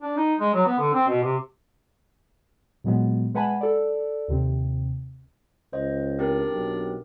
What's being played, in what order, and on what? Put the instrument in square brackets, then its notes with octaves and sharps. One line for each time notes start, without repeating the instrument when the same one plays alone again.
[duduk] D4
D#4
G#3
F#3
B3
D3
C4
B2
C3
[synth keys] A#2 F#3 G#3 B3
G#3 B4 F#5 G#5 A5 B5
A4 D5
D#2 C3 C4
[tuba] C#2 [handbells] C5 D#5
[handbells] C4 G4 A#4 [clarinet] D4
[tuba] B1